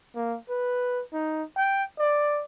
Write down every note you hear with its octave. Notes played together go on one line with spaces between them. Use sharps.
A#3
B4
D#4
G5
D5